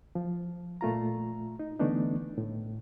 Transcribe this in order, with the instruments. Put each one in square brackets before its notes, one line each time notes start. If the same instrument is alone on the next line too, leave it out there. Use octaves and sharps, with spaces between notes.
[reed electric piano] F3
A#2 A3 F4 A#5
D#4
D3 E3 A3 B3 D4 D#4
A2